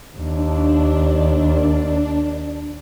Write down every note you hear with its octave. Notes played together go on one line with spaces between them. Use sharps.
D#2 D4